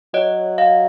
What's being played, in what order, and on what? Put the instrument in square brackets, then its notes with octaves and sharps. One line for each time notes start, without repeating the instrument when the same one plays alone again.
[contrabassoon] F#3 [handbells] C#5 D#5
[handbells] D#5 F5